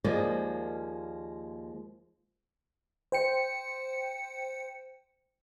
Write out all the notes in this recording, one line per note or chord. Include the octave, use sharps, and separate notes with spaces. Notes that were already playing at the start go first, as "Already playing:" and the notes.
D#2 F3 G#3 A#3 D5 D#5
C5 G5 C#7